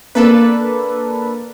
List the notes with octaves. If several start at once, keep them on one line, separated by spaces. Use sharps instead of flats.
A#3 D4 A4 B4